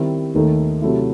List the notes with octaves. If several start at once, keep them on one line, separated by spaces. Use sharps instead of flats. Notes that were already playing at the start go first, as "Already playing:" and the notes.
Already playing: D#3 G3 C4 E4
D#2 D#3 A3 D#4 A4
C3 F#3 A3 E4